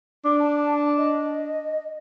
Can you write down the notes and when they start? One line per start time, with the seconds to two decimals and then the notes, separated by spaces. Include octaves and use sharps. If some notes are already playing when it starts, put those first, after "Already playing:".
0.25 D4 D6
0.39 A5
0.97 D#5